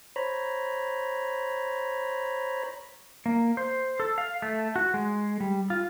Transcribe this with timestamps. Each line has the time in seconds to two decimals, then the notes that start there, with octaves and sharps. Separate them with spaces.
0.16 C5 C#5 A#5 B5
3.26 A#3
3.57 C5
4.00 A4
4.18 F5
4.42 A3
4.76 F#4
4.94 G#3
5.40 G3
5.70 F4